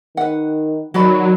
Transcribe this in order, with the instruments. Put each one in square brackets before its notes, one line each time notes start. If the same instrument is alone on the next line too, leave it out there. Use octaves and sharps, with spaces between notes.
[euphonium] D#3 [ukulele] B4 F#5
[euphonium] D#3 [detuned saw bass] F#3 [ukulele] F#4 D5 B5